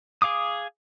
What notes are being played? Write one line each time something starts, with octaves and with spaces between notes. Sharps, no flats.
G#4 F5 D6 D#6